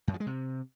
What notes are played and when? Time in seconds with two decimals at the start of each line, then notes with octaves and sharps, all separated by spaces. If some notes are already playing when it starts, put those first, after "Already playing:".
0.08 F#2
0.14 F3
0.20 G#3
0.27 C3